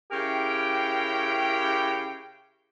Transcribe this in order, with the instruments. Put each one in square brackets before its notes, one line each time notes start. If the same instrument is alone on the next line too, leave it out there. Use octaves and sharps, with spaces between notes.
[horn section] C#3 E4 G4 A#4 G5